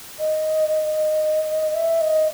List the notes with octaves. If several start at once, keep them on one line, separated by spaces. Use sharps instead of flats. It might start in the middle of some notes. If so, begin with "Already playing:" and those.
D#5
E5
D#5